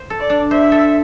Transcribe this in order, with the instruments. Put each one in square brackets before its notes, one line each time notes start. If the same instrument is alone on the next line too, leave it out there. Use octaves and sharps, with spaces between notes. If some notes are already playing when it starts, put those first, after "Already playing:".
Already playing: [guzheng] C5
A4
[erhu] D5
[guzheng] D4
[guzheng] C5 [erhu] E5
[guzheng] A4